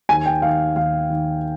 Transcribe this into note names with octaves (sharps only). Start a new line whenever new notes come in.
D#2 G#5
G5
D#3 F5
D#2 F5
D#3